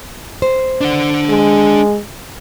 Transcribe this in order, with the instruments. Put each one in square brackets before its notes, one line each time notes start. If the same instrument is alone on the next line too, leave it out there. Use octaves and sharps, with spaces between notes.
[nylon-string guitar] C5
[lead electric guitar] D4 F#5
[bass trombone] G#3